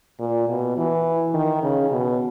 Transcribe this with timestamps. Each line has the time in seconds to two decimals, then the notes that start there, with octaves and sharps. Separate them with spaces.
0.20 A#2
0.49 B2
0.77 E3
1.34 D#3
1.63 C#3
1.91 B2